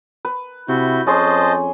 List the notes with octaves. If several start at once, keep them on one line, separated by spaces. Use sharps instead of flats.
B4
C3 E4 F#4 G6
F2 C#4 G#4 C5 D#5 A5 C6